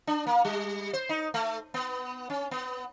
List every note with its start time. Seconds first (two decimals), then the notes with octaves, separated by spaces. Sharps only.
0.07 D4
0.27 A#3
0.45 G3
0.93 C5
1.09 D#4
1.34 A3
1.74 B3
2.30 C#4
2.51 B3